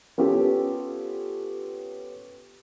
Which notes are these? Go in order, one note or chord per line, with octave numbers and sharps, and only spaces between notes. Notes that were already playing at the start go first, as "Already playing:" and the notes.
B3 C#4 F4 G4 A4